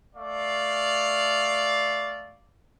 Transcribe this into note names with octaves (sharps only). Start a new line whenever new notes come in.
A3 D5 F5